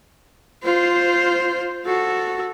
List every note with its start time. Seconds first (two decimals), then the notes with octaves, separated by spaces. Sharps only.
0.63 F4 C5
1.86 F#4 A4